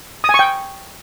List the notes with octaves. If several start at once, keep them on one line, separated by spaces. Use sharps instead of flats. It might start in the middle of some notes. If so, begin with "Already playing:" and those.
D#6
G#5
C#6
G5